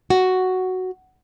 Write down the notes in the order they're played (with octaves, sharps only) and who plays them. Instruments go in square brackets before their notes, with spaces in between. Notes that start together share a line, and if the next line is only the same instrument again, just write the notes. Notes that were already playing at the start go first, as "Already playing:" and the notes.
[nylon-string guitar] F#4